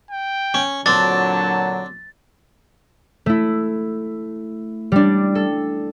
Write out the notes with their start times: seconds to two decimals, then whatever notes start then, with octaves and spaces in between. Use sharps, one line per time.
0.11 G5
0.54 C#4
0.86 A#2 D3 F#3 C4 D4 A5 A6
3.26 A3 E4
4.92 G3 D4
5.35 A4